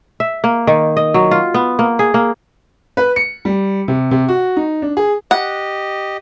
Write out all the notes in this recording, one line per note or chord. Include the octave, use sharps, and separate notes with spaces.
E5
A#3
D#3
D#5
F#3
F4
B3
A#3
G#4
A#3
B4
C#7
G3
C3
C3
F#4
D#4
D4
G#4
G4 D#5 F#5